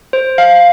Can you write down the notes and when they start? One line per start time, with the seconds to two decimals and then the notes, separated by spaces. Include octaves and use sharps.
0.13 C5
0.38 F5